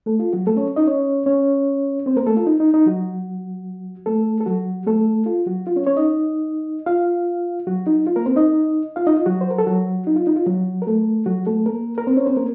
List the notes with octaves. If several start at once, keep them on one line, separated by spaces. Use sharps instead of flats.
A3 A4
F4
F#3 F#4
A3 A4
C#4 C#5
D#4 D#5
C#4 C#5
C#4 C#5
C4 C5
A#3 A#4
A3 A4
F4
D#4
D#4
D#4
F#3 F#4
A3 A4
A4
F#3 F#4
A3 A4
F4
F#3 F#4
F4
C#4 C#5
C#4 C#5
D#4 D#5
F4 F5
F#3 F#4
D#4
F4
A#3 A#4
C4 C5
D#4 D#5
F4 F5
D#4 D#5
F4
F#3 F#4
C5
A#4
A4
F#3 F#4
D#4
F4
D#4
F4
F#3 F#4
A#4
A3 A4
F#3 F#4
A3 A4
A#3 A#4
A#4
C4 C5
C#4 C#5
C4 C5
A#3 A#4